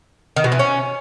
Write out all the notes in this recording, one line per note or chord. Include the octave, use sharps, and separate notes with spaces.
D#3
B2
E3
C#4